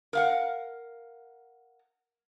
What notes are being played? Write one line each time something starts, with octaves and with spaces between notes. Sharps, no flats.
A#4 F5 F#5